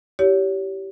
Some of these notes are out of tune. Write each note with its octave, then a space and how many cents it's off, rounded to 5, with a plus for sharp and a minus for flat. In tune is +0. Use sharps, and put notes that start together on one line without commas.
E4 +0 G4 -15 C#5 +30